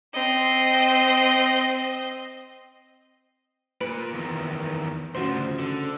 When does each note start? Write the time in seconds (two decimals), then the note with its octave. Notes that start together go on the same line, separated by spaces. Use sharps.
0.14 C4 D#5
3.81 A#2 B4
4.13 E2 D#3
5.15 D2 C#3 F3 F#4 C5
5.59 D3